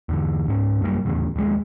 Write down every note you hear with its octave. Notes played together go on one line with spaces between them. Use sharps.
E2 D3 E3
G#2 C#4
F#2 G3 G#3 A#3
D#1 E2 A2 C#3
D#1 A#1 E3 G#3